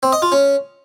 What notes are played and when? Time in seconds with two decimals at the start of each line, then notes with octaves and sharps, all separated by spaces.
0.03 C4
0.13 D#5
0.22 F4
0.32 C#4